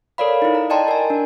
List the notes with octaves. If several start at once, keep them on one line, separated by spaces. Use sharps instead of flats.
A4 A#4 C#5 D5 F5 B5
D#4 E4
A#5
D5 D#5 G5 A5 A#5 C6
A#4 G#5
D4